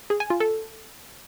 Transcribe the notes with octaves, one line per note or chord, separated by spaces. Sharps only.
G#4
G#5
F4
A4